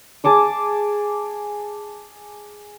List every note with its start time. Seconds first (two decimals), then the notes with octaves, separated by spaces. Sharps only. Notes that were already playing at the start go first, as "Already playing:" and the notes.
0.24 G#4 A5 D6 D#6